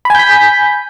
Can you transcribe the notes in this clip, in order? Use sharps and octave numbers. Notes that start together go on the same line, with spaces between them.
G#5 B5 G6 B6